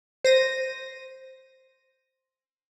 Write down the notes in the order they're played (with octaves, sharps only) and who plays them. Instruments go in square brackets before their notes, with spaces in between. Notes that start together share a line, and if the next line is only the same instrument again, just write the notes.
[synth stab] C5 A#6 D#7